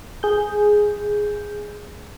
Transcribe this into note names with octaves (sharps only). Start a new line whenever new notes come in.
G#4 G6